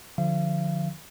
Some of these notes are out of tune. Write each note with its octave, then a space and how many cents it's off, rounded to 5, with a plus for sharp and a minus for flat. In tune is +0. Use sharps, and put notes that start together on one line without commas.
D3 +30 F3 +20 F5 -40